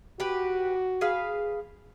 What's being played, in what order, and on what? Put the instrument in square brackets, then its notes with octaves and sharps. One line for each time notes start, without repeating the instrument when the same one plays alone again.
[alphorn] F#4 [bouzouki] G4 B4
[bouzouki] G#4 B4 F5